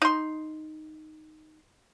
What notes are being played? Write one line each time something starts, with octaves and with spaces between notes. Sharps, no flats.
D#4 C6